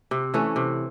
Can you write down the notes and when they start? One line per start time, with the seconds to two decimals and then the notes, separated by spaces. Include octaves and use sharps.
0.11 C3
0.34 E3 A3 C#4
0.56 C3